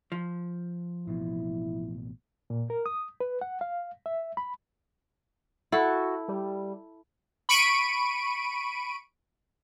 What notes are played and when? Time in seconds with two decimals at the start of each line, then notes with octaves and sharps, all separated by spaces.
0.12 F3
1.07 A1 B2 E4
2.50 A#2
2.70 A#4
2.86 D#6
3.20 B4
3.41 F#5
3.61 F5
4.06 E5
4.37 B5
5.72 E4 F#4 A4
6.28 G3
7.49 B5 C#6 D7 D#7